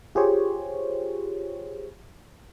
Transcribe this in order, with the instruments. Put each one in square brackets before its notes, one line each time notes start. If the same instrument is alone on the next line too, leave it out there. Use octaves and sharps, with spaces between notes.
[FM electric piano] F4 G4 G#4 C5 C#5